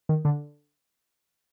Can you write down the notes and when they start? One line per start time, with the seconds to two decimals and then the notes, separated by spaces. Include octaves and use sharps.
0.09 D#3
0.25 D3